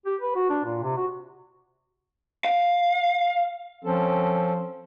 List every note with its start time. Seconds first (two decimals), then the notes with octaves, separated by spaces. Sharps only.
0.06 G4
0.21 B4
0.36 F#4
0.50 D4
0.65 A#2
0.83 C3
0.97 F#4
2.44 F5
3.84 F3 C4 C#4 A4